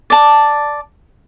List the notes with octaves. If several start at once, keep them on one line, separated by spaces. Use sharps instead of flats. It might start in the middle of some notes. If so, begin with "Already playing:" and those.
D5 A5